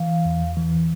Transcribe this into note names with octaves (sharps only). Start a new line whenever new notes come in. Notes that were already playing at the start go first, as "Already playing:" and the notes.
Already playing: E3 F5
E2
E3